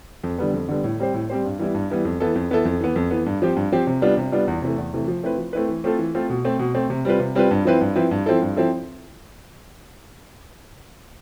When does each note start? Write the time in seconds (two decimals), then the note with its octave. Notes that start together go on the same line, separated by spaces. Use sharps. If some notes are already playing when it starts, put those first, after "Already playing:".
0.24 F2
0.38 D3 G3 B3
0.54 F2
0.69 D3 G3 B3
0.84 A2
1.00 G3 C4 G4 C5
1.14 A2
1.30 G3 C4 G4 C5
1.45 G2
1.59 E3 G3 B3 E4
1.74 G2
1.90 E3 G3 B3 E4
2.05 F2
2.20 E3 B3 E4 A4
2.35 F2
2.51 E3 B3 E4 A4
2.65 F2
2.80 E3 B3
2.96 F2
3.11 E3 B3
3.26 G2
3.42 F3 C4 G4
3.56 G2
3.72 F3 C4 G4
3.87 C3
4.02 G3 B3 D4 F4
4.17 C3
4.32 G3 B3 D4 F4
4.48 E2
4.62 C3 E3 A3
4.78 E2
4.93 C3 E3 A3
5.08 F3
5.23 A3 C4 E4 B4
5.38 F3
5.53 A3 C4 E4 B4
5.69 E3
5.84 A3 C4 F4 A4
5.99 E3
6.15 A3 C4 F4 A4
6.30 B2
6.45 A3 C4
6.59 B2
6.75 A3 C4
6.90 C3
7.05 G3 C4 F4 B4
7.20 C3
7.35 G3 C4 F4 B4
7.51 G2
7.65 F3 C4 E4 B4
7.81 G2
7.96 F3 C4 E4 B4
8.11 G2
8.26 F3 C4 E4 A4
8.42 G2
8.56 F3 C4 E4 A4